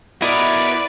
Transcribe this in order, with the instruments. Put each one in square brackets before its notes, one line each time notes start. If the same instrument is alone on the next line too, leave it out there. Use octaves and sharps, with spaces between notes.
[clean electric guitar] B3 F#4 D#5 [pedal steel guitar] E4 [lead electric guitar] A#4 B4 [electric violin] D5